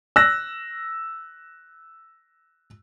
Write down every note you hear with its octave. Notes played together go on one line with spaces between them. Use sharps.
E6 F#6 A#6